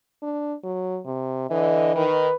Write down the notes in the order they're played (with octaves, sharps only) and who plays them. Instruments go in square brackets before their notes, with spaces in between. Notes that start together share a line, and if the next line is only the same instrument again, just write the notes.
[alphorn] D4
F#3
C3
[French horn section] D3 D#5 [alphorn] E3
[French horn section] D#3 [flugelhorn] B4